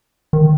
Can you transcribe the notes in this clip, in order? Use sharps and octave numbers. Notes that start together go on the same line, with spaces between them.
D#3